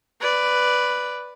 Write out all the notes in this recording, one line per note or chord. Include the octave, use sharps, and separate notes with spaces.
B4 D5